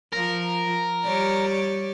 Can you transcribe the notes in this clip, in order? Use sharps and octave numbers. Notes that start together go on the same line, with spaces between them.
F3 A#4
G3 C#5 D5